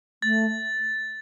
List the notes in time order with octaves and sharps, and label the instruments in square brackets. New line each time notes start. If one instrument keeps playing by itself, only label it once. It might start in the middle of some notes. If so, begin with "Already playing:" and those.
[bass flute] A3 [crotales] A6